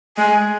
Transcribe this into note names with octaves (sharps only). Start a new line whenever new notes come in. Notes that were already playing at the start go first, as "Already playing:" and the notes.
G#3 G#5